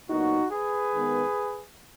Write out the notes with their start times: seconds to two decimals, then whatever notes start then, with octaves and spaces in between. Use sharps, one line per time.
0.09 A#2 F#3 B3 D#4 F#4
0.51 G#4 B4
0.94 D#3 G#3 B3